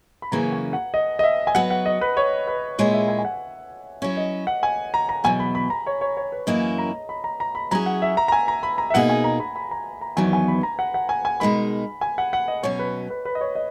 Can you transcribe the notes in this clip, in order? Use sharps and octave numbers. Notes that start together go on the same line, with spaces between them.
B5
F#2 C#3 E3 A#3 C#4 A#5
G#5
F#5
D#5
D#5
E5
G#5
F#3 B3 F#4 B4 F#5
F#5
D#5
B4
C#5
B4
A#2 G#3 C#4 E4 C#5
E5
G#5
G#5
F#5
F#3 C#4 E4 C#5
D#5
F#5
G#5
A#5
A#5
E2 B2 F#3 G#5
B5
B5
A#5
C#5
C#5
C#5
B4
F#2 E3 A#3 C#4 E4 D#5
A#5
B5
A#5
A#5
B5
F#3 C#4 E4 G#4 A#5
F#5
E5
A#5
A#5
G#5
A#5
B5
A#5
E5
B2 A#3 D#4 G#4 F#5
G#5
A#5
B5
B5
A#5
A#5
E2 D#3 F#3 B3 G#5
G#5
B5
A#5
F#5
F#5
G#5
G#5
B2 G#3 D#4 A#4 B5
G#5
F#5
F#5
D#5
B2 F#3 C#4 C#5
B4
B4
B4
D#5
C#5
D#5